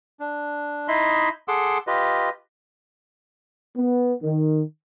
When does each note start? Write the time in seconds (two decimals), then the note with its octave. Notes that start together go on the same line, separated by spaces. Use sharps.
0.20 D4
0.88 D#4 E4 D#5 E5 B5 C6
1.48 G#4 A4 F#5 C6 D6 E6
1.87 F4 G4 B4 D#5
3.77 B3
4.23 D#3